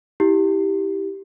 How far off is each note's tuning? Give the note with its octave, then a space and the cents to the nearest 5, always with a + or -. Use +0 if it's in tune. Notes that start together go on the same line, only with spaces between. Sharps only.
E4 -25 G4 -5